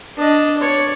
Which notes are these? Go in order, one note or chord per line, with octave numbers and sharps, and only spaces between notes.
D4 D#5
C#5 D5